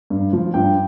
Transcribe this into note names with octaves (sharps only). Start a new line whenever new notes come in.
G2
F3
G2 G5